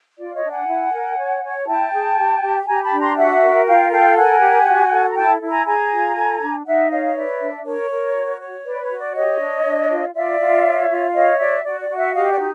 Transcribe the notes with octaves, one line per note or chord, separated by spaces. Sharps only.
F4 D5
C#5 D#5
D4
F#5 G#5
E4
A#4
C#5
C#5
E4 G5 A5
G#4
G4
G4
G4 G#5 A#5
A5 B5
D4
A#5 C6
F#4 E5 F#5
A#4
F4 F5 G5
A4 F5 G5
A#4 F#5 G#5
G4
F#4
A4
A#5
E4 G5 A5
E4
G#5 A#5
G#4 G#5 A#5
F4
A4
D4
D#4 E5 F#5
C#5 D#5 F5
D#5
B4 D5 E5
D4
A#4 C#5
A#4
F#4
C#5
B4 D5
C#5
F#4
D5
G4 C#5 D#5
D4
D4
F4
F4 D5 E5
F4
C#5
F4
C#5 D#5 F5
F#4 D5 E5
F#4 D5
D5
F#4
E5 F#5
G4 D#5 F5
D5
D#4